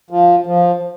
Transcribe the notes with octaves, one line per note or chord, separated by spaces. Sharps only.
F3
F3